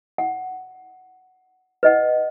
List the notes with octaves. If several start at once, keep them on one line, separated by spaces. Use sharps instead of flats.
F#5
B4 D#5 F#5